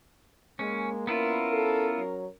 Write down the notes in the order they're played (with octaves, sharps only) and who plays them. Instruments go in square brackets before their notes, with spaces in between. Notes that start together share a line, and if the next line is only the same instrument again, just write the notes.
[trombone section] G#3 [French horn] A#3 [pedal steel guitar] C#4
[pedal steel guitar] B3 E4 F4 [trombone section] C#4 A#4
[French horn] A4
F#3